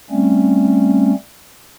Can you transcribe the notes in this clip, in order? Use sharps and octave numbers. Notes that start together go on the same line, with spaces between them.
G3 A3 C4 C#4